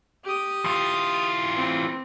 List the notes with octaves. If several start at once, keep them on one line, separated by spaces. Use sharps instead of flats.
G4 D#6
E3 F4
C4